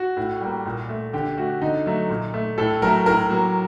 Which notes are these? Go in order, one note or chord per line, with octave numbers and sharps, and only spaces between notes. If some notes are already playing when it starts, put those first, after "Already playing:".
Already playing: F#4
A2
G3 A#3
A#2
A3
D3 G4
A3 F#4
D3 D#4
F#3 A3
A#2
A3
A2 A4
F#3 A3 A#4
A2 A#4
F#3 A#3